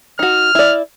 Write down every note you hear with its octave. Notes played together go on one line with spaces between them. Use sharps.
D#4 F#4 F6
E4 D5